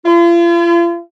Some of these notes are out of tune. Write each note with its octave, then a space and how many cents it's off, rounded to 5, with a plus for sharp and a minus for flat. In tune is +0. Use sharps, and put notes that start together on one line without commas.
F4 -40